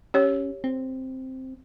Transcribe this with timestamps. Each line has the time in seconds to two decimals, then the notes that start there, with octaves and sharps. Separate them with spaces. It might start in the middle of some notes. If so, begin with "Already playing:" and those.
0.14 C#4 G4 C#5
0.64 C4